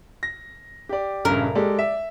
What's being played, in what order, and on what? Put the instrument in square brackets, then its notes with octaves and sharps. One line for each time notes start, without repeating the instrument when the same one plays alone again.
[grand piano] A#6
G4 D5
[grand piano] A#1 G2 C#3 [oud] A#4
[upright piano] G#3 G4 A4 [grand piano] D5
[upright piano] E5